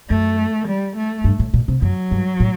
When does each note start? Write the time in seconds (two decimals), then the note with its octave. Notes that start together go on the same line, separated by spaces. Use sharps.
0.10 F#2 A3
0.68 G3
0.96 A3
1.24 G2
1.39 A2
1.54 A#2
1.68 C3
1.82 F#2 F#3
2.11 G2
2.40 A2